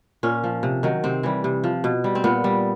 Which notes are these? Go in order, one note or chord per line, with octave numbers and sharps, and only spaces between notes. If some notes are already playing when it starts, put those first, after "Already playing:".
A#2 C#4
F3
C3
D#3 F#3
C3 C4
E3 G3
C3
F3
B2
G3
C4
A#2 B3
G3